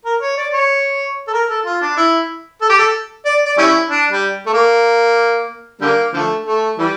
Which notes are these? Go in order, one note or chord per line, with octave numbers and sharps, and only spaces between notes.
A#4
C#5
D5
C#5
A4
A#4
A4
F4
D4
E4
A4
G4
A4
D5
D5
G3 C#4 E4
D4
G3
A3
A#3
D3 G3 A#3
D3 F3 A3
A3
E3 G3